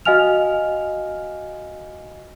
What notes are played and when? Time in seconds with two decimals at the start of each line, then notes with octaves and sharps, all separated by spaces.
0.05 F#4 D#5 F5 G#5 F6 F7